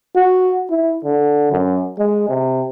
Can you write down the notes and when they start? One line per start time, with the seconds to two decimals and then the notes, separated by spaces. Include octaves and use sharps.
0.15 F#4
0.70 E4
1.04 D3
1.52 F#2
1.99 G#3
2.29 C3